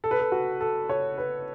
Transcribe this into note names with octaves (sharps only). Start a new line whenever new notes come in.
A4
B4
A4
F#4
A4
C#5
B4